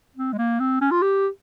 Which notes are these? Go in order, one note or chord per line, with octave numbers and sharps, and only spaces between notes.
C4
G#3
A#3
C4
C#4
F4
G4